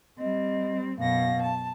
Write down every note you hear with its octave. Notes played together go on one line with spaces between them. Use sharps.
G3 C4 D#5
F#2 B2 F5 A#6
A5